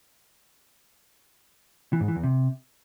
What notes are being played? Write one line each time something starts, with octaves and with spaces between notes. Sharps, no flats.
E3
G#2
E3
E2
C3